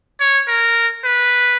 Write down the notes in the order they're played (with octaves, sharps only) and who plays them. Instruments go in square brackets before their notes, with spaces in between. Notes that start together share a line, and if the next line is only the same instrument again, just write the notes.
[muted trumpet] C#5
A#4
B4